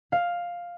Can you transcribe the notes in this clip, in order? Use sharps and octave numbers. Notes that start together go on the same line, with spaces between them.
F5